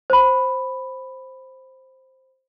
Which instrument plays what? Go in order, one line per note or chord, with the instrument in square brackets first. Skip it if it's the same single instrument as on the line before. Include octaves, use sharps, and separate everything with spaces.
[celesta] C5 B5